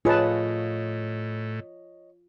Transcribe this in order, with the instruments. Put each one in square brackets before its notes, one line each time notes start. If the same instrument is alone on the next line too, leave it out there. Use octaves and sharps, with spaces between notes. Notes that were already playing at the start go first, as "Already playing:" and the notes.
[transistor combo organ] A2 [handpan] F4 [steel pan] G#4 B4 A5 [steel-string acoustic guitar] C#5 D#5